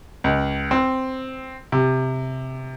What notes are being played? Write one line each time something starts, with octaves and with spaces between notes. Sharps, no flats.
C#2
C4
C3